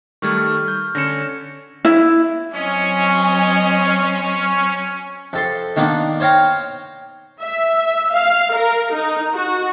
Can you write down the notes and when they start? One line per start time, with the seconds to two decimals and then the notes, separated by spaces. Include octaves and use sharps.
0.22 D#3 G3 A3 C#6 F6 G#6
0.68 G6
0.95 D3 C#4 A#6 C#7 E7
1.85 E4
2.55 F#3 C4 C#4 D#5 G#5
5.33 F2 A4 C6
5.76 D#3 A#3 B3 D4
6.20 C5 C#5 F5 G5 A#5
7.42 E5
8.15 F5
8.56 A#4
8.93 D#4
9.36 F#4